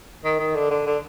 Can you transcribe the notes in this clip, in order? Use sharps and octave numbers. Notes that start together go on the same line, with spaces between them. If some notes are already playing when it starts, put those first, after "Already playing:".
D#3
D#3
D3
D3
D3